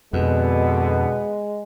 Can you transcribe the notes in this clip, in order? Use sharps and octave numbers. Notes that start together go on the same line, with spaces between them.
F2 B2 D3 G#3 B3